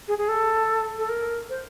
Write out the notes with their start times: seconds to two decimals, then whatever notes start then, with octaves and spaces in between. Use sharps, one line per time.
0.08 G#4
0.18 G#4
0.28 A4
0.98 A4
1.09 A#4
1.50 C5